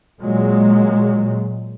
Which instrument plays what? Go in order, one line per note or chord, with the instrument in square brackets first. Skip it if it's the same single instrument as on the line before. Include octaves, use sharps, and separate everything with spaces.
[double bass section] A#2 F#3 G#3